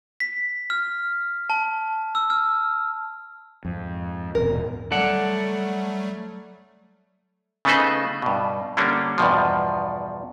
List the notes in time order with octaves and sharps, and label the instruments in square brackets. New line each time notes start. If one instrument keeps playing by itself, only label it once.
[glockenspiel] B6
F6
A5
E6
F6
[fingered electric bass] F2 [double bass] G#2
[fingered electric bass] D#1 E2 B2 [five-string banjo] A#4
[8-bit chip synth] F#3 G3 A3 [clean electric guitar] A4 D5 F#5
[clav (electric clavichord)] C#3 A3 B3 D#4 B4 C5
G2 B2
D3 G3 A#3 C#4 D4
E2 G2 B2 F3